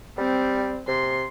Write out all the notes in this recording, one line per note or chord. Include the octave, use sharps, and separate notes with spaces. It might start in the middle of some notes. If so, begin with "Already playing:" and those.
G3 C4
C3 C6